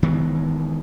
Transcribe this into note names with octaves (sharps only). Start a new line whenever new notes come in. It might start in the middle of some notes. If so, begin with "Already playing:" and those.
D#3 E3 G#3 B3